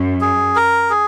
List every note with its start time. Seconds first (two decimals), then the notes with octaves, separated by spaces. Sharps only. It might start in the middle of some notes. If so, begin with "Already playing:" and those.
Already playing: F#2
0.21 G#4
0.56 A#4
0.90 G#4